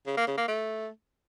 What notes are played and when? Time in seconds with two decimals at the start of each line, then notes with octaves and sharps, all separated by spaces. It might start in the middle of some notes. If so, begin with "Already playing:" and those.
0.06 C#3
0.17 A#3
0.27 C#3
0.37 A#3
0.48 A3